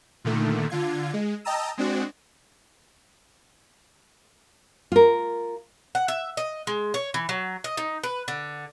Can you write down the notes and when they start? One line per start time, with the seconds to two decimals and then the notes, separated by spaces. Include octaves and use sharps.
0.25 A#2 D3 D#3 A3
0.70 D3 F4 G#6
1.14 G#3
1.45 D#5 G5 A5 A#5 D#6 E6
1.78 G#3 C4 D4 F#4
4.92 F4 A#4
5.95 F#5
6.08 E5
6.37 D#5
6.67 G#3
6.94 C#5
7.14 E3
7.29 F#3
7.64 D#5
7.77 D#4
8.03 B4
8.28 D3